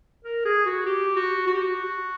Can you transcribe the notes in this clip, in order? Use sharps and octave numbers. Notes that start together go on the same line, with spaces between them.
A#4
G#4
F#4
G4
F#4
F#4
G4
F#4